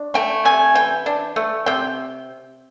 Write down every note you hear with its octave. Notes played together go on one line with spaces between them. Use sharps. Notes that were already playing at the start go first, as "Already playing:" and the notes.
Already playing: D4
A3 G5
C3 G#5
E3 G5
D4
A3
C3 G5